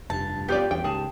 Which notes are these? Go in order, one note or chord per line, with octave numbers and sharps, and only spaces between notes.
F1 G2 A5
B3 F4 G4 D5
E2 G2 G5
C#2 G#2 G#4 A5